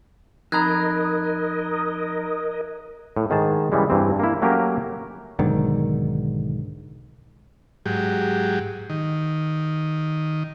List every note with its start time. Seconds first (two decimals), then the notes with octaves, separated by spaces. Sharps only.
0.52 F2 D#4 A#4 D#5 A#5 B5 F#6 G#6
3.17 A2
3.30 G#2 D#3 G#4 A5
3.72 C#3 E3 G3 G#3
3.90 G2 E3 C4
4.20 A#3 E4
4.42 F#3 A3 A#3 C#4 G4 A#4
5.39 B1 G#2 D3 D#3
7.86 G#2 F#3 G4
8.90 D#3